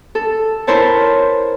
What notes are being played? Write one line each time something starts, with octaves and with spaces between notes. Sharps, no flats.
A4
E4 A#4 C5 C#5 A5